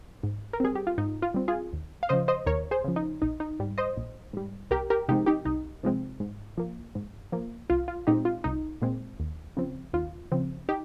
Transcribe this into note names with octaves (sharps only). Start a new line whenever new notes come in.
G#2
A#4
G3 C4 G#4
G4
F4
G#2 D#4
F4
G3 C4
F4 G#4
D#2
F5
C#3 F3 C5 D#5
C5 D#5
D#2 A#4 C#5
G#4 C5
C#3 F3
D#4
A#1 D#4
D#4
G#2 G3
C5 D#5
A#1
G#2 G3
C2 G4 A#4
G4 A#4
C3 F3 G#3 C4 D#4 G4
D#4 G4
C2 D#4
C3 F3 G#3 C4
G#2
F3 A#3
G#2
F3 A#3
C2 F4
F4
A#2 G#3 C4 D#4 G4
F4
C2 D#4
A#2 G#3 C4
D#2
C#3 F3 C4
D#2 F4
C#3 F3 C4
D#4 G4